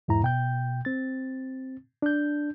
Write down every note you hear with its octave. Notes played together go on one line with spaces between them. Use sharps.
E2 G#2 E4 A#5
B2 G5 G6
C4 A6
D4 G6